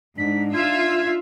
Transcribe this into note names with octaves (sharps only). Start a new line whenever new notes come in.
G#2 D4 D#4 B6
F4 E5 G#6